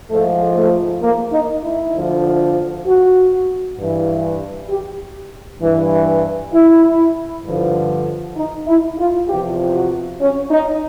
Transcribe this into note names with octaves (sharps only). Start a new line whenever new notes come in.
G#2 F3 A3
A3
A#3
D#4
E4
D2 D3 F3
F#4
G2 E3
G4
G2 E3
E4
G2 D3 F3
D#4
E4
F4
E2 C3 F3 G4
F#4
C#4
D#4